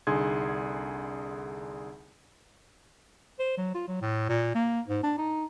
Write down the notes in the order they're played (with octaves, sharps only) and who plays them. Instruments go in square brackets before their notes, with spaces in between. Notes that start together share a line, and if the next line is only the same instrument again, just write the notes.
[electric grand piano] C2 D3 D#4 G#4 C6 G#6
[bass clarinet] C5
F#3
F4
F#3
A2
A#2
A#3
G#2
D4
D#4